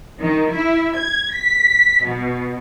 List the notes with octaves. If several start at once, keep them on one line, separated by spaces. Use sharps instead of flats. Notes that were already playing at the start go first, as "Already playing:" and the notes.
D#3
E4
G#6
B6
B2